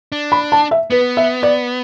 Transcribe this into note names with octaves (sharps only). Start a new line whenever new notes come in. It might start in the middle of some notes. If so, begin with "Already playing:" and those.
D4
B5
A5
E5
B3 B4
E5
D5